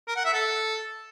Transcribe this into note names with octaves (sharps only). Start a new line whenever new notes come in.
A#4
F#5
E5
A4